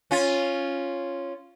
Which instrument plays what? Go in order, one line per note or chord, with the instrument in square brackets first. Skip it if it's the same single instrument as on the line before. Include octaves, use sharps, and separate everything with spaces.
[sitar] C#4 F4